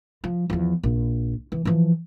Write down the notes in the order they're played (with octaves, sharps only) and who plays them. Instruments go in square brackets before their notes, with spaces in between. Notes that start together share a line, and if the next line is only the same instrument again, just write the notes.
[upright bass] F3
E2 F3
A#1
E3
E3 F3